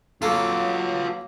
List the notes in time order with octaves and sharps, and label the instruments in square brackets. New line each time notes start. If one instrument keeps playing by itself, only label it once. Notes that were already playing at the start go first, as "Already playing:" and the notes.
[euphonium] F#3 [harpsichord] A#3 A4 A#4 [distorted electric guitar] F4 C#5